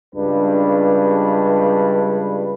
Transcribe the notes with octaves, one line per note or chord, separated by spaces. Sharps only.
C#2 G2 G3 D4 B4